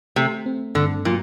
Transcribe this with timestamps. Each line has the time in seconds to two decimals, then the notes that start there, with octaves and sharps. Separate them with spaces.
0.16 C3 A3
0.46 C4
0.75 G2 D3
1.05 A#2 F#3